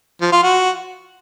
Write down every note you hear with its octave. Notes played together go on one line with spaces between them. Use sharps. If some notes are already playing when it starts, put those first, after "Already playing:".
F3
F4
F#4